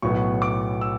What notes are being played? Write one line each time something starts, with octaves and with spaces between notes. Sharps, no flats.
B1 A2 F#3 B3 C#6
D6
E6